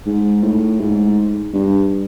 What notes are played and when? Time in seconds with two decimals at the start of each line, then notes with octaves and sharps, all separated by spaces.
0.06 G#2
0.43 A2
0.80 G#2
1.53 G2